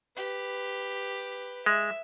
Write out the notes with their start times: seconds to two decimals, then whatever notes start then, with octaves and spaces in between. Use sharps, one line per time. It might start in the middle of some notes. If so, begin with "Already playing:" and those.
0.16 G4 B4
1.66 G#3 E5